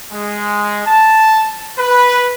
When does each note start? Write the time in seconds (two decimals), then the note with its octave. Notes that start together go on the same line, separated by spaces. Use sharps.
0.12 G#3
0.87 A5
1.79 B4